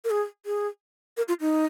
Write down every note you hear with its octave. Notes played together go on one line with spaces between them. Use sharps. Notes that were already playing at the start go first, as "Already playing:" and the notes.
A#4
G#4
G#4
A#4
F4
D#4